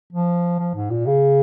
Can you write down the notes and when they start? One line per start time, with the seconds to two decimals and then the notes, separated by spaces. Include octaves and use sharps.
0.13 F3
0.59 F3
0.75 G#2
0.91 A#2
1.07 C#3